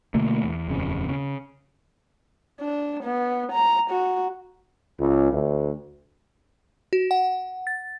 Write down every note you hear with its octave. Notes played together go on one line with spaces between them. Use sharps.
B2 D3 A3 A#3
E2
D#1 F2 C#3
C#3
D4
B3
A#5
F#4
C#2
D2
F#4
F#5
A6